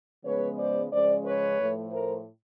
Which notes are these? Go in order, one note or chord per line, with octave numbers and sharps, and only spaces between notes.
C#3 F3 G#3 B3 B4 C#5
C5 D5
C#3 F3 G#3 C#4 C5 D5
B4 C#5
A2 F3 A3
A#4 C5